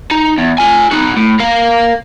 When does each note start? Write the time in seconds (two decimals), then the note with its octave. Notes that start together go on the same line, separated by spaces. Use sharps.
0.11 D#4
0.38 E2
0.58 F4 G#5
0.92 D#4 F#4
1.16 A2
1.40 A#4 F5